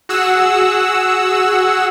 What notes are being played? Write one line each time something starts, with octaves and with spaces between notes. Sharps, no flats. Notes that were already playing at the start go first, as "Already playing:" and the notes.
F#4 G#4 F#5 E6